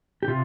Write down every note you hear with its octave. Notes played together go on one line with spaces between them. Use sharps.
G4
C3 F4